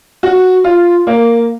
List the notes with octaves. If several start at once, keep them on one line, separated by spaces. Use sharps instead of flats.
F#4
F4
A#3